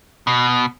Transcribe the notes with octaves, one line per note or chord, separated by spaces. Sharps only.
B2